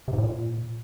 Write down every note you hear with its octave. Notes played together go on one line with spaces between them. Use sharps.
C3
G#2
A2
A#2